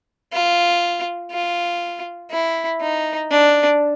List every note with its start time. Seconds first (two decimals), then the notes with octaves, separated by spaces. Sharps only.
0.33 F4
1.32 F4
2.32 E4
2.81 D#4
3.31 D4